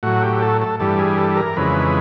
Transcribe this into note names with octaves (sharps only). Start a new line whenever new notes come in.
A2 F#3 F#4
G4
A4
A4
G2 E3 G3 A4
G#4
A4
A#4
F2 C#3 E3 G#3 B4